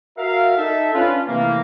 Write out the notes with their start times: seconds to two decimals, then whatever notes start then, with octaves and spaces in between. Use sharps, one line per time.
0.18 F#4 A#4 E5 F5
0.57 D#4 A4 E5
0.94 C#4 D4 F4 B4
1.28 C3 E3 F3 A3 A#3